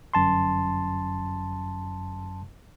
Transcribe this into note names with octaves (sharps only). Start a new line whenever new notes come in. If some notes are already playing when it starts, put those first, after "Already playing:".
G1 F#2 A5 C6